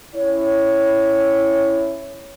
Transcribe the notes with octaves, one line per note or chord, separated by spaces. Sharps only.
C#4 E4 C#5